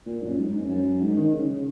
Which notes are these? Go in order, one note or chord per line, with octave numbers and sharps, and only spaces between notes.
A#2
F#2
G#2
G#2
F#2
F#2
G#2
D#3
C#3
C#3